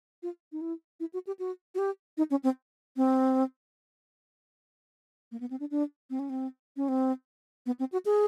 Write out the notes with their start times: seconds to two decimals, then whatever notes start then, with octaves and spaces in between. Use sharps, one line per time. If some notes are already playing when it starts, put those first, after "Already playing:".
0.23 F4
0.52 D#4
0.61 E4
1.00 E4
1.14 F#4
1.27 G4
1.39 F#4
1.75 F#4
1.79 G4
2.18 D#4
2.31 C#4
2.44 C4
2.97 C4
5.32 A#3
5.40 B3
5.51 C4
5.60 D4
5.71 D4
6.10 C4
6.19 C#4
6.30 C4
6.77 C#4
6.88 C4
7.66 B3
7.79 C4
7.92 F#4
8.05 G#4